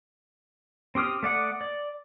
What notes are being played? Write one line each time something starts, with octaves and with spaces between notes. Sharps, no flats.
C4 G4 D#6 F6
A3 D5 F#5 D#6
D5